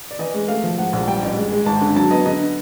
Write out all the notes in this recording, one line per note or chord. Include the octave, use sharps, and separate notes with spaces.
D5
E3 D#5
G#3
A3 F5
F3
G#2 F#5
A#1
G3 G5
A1
G#3
G#3
G#1 A5
D3
F#3 A5
B3 D#5
D3 D#5